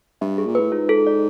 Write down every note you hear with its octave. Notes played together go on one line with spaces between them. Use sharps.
G2 E5
G#4
A#2
A2 B4
G#2 F4
A4
D5